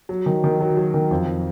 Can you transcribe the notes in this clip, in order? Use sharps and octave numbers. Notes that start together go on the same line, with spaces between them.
F#3
D#3
D#3
F#3
F#3
D#3
F2